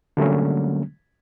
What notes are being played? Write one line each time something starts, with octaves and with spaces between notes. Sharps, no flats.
D3 F#3 G3 A3 A#3 C#4